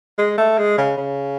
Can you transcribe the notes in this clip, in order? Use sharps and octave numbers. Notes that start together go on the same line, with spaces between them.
G#3
A3
G#3
C#3
C#3